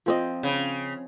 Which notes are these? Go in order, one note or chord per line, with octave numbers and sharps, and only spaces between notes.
F3 C4 D#5
C#3